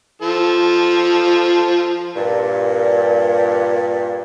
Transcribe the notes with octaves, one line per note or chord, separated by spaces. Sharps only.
F3 A4
G2 A#2